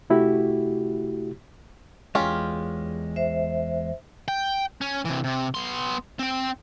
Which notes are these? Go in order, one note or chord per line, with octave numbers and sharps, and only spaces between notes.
C3 A3 E4 F#4 G4
E2 G#3 C#4 F4 G4
C5 E5
G5
C#4
C3 E3
C3
B3 C6
C4 G5